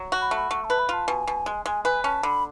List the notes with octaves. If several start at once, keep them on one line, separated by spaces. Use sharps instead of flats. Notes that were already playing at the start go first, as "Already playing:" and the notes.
Already playing: F#3
F#4
B5
A3
B5
A3 C#6
A5
B4
B5
F4 A5
B2 G#5
B2
G#3
G#3 G#5
B4 G#5
C#4 A5
D3 B5